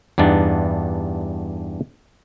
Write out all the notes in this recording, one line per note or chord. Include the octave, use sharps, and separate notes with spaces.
E2 G2 B3 D4 D#4